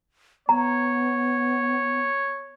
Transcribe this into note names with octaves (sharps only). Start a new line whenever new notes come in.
B3 C#5 A#5